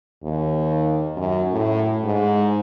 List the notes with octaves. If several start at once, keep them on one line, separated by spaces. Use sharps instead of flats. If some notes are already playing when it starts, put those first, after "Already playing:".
D#2
F#2
A2
G#2